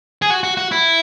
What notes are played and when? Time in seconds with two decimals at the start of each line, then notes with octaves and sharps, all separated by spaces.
0.22 G#4
0.30 F#4
0.43 F#4
0.57 F#4
0.71 E4